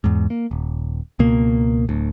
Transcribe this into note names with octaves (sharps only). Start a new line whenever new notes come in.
E2 G#2
A#3
D#1
C#2 B2 A#3
D1 D2